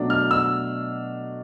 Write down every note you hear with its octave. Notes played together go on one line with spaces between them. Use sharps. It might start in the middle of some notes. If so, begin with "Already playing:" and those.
Already playing: B2 F#3 A3 D4
F6
E6